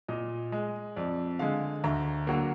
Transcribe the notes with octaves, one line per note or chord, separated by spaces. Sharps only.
A#2 D#5
G#3
F2 D5
D3 G#3 F5
D2 A#5
D3 F#3 A#3